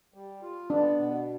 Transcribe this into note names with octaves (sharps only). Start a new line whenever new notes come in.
G3
F4
B3 D4
B2